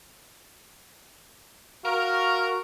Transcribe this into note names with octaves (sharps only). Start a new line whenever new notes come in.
F#4 A#4 F5